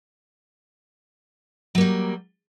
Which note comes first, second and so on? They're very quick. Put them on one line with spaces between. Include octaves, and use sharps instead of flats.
F#3 A#3 G3